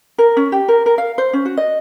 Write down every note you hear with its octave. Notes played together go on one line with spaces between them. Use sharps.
A#4
C#4
G4
A#4
A#4
F5
C5
C#4
F#4
D#5